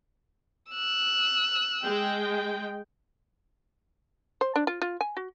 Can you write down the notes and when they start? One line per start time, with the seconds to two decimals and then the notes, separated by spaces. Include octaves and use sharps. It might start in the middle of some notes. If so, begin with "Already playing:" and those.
0.71 E6 F#6
1.82 G#3 G5
4.41 C5
4.56 D4
4.67 F4
4.82 F4
5.01 G#5
5.17 F#4